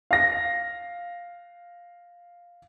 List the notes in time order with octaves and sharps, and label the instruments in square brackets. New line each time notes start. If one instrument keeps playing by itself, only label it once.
[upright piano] F5 A#6